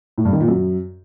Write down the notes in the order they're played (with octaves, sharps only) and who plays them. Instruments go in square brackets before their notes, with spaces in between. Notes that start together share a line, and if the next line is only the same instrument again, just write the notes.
[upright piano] A2
G2
D#3
A#2
F#2